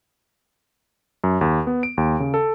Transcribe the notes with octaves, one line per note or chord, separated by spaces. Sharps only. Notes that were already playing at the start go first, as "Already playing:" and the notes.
F#2
D#2
B3
D7
D#2
C#3
A4